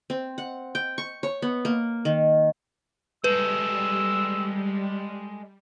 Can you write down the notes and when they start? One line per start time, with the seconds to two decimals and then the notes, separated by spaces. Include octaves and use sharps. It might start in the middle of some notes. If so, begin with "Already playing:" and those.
0.10 C4
0.38 F#5
0.75 G5
0.98 C#6
1.23 C#5
1.42 B3
1.65 A#3
2.05 D#3
3.24 G3 G#3 A4 B4 E6